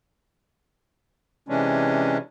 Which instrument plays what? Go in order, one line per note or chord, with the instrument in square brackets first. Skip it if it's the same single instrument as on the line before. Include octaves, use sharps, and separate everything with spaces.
[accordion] C3 E3 G#3 C#4 D4